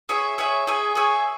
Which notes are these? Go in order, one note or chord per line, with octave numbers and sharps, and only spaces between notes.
G#4 C#5 E5 G#5
G#4 C#5 E5 G#5
G#4 C#5 E5 G#5
G#4 C#5 E5 G#5